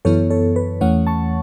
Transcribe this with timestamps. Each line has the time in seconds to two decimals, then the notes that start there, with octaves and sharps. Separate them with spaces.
0.05 F#2 E3 B3 E4 A4 C#5
0.30 A4 C#5
0.56 B4
0.81 E2 E3 A3 C#4 C#5 F#5
1.07 A5 C#6